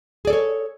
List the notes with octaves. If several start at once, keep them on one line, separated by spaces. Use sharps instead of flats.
G#4 A4 C#5 D5